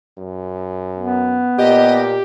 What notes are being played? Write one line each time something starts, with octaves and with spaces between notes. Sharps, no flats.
F#2
B3
A#2 G4 D#5